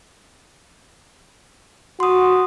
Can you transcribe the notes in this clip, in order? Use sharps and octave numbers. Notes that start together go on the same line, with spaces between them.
F#4 C6 D#6